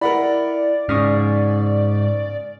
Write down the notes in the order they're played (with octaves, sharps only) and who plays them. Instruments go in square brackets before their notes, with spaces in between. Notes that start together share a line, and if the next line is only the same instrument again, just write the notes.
[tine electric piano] E4 [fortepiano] A#4 F#5 B5 [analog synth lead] D5
[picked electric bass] G#2 [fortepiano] C#3 [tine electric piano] C#6 D#6 F6